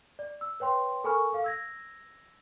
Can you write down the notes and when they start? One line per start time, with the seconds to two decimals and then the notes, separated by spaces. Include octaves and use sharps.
0.19 D5
0.41 E6
0.60 B4 C#5 G5 C6
1.04 A4 A#4 G#5 B5 C#6 F6
1.32 A4 F5
1.44 E6 G#6 A#6